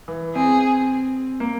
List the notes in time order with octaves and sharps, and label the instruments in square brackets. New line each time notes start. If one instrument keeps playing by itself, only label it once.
[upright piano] E3
[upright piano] C4 [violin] G#4
[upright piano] A#3